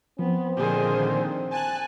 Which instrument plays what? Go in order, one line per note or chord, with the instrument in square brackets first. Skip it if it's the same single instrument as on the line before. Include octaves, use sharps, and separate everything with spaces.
[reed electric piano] F3 [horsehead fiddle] B3 [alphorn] C4
[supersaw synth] A#2 D3 D#3 [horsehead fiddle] G#4 C5
[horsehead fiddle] G#5 [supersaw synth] A5 F#6